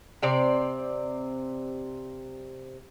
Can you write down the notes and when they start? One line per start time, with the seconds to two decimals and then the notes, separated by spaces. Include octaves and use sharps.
0.22 C3 C4 D5